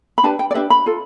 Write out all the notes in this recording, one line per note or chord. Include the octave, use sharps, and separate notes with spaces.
B5
D4 G4 B4 A5
G5
D5
D4 G4 B4 E5
B5
F4 A4